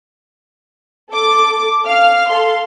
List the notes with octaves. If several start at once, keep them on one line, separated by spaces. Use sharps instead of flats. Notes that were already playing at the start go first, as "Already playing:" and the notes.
A4 D6
F5 F6
A4 C6